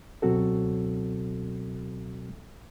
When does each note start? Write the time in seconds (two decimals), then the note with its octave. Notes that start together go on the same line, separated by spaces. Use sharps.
0.22 C#2 B2 F#3 C4 F#4 A4